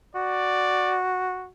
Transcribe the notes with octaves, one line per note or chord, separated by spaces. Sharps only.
F#4 D5